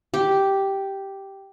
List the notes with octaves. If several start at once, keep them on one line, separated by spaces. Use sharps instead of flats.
G4